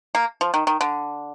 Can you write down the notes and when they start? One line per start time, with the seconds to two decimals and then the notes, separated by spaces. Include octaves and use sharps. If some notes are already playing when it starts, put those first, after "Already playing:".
0.15 A#3
0.41 F3
0.54 D#3
0.67 D#3
0.81 D3